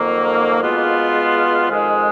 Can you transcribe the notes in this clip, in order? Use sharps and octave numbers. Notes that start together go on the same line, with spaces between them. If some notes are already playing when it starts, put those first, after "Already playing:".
Already playing: F2 D#3 F#3 A#3
B2 G#3 B3 F4
F2 D#3 G#3 D#4